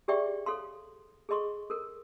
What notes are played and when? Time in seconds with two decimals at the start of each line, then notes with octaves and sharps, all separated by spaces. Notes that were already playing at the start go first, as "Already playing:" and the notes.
0.08 G4 G#4 D5 E5 G5 C#6
0.46 A4 C#5 F5 C6
1.29 G#4 A4 D#5 C6 C#6
1.70 A4 A#4